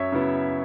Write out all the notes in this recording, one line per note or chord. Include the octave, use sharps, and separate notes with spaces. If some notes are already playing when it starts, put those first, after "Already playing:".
Already playing: F#2 C#5 E5
C#3 F#3 B3 E4